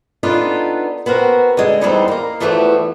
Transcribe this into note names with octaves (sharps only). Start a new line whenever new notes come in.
B3 D4 D#4 F4 A4 B4
B3 C4 F#4 A#4
D3 G#3
E2 G3 G#3 B3 C4 D#4
A#3 A#4
E2 E3 F3 A3 F#4 G4